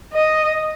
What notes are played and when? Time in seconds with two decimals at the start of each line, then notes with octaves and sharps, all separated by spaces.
0.14 D#5